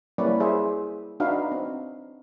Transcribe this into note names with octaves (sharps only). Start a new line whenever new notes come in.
G3 A#3 C#4 E4 B4 D5
E4 G#4 C5 E5
D4 D#4 F#4 B4 E5 F5
C4